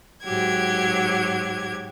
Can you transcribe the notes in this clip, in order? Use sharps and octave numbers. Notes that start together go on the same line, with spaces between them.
G#2 F#3 G4 G#6